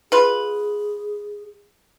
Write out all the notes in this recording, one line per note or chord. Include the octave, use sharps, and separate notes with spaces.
F4 G#4 B4